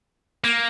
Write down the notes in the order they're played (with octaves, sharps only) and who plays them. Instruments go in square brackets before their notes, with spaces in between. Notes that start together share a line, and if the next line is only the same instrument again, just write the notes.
[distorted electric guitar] A#3